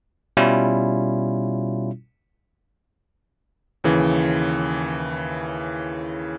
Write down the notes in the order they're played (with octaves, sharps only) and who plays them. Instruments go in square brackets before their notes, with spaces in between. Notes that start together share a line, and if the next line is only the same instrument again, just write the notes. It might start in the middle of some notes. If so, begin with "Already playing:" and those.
[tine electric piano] B2 G3 C#4 E4 F4
[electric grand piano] D#2 C#3 E3